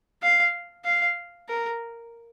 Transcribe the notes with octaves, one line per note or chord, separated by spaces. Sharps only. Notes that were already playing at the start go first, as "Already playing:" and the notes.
F5
F5
A#4